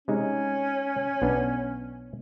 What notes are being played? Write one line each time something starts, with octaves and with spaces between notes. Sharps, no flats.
C3 G#3 C#4 D#4
B1 B3 D4